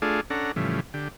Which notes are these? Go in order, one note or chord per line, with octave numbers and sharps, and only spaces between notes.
A3 D4 F4 G#4
C#4 D4 A4 F#5 A#5
A2 C#3 E3 F3 G3
D3 G4